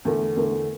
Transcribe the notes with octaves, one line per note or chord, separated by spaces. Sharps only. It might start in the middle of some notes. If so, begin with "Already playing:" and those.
E2 D3 A3
E2 D3 A3